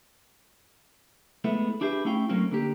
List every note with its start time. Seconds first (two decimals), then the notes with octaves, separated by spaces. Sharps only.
1.44 G#3 A3 B3 E4
1.81 D4 E4 G4 G#4 B4
2.05 A3 C#4 E4 F5 G5
2.29 F#3 A3 A#3 C4 C#4 F#4
2.51 D3 A#3 G4